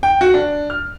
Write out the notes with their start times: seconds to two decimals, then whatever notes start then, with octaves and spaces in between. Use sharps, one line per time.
0.03 G5
0.21 F#4
0.34 D4
0.70 F6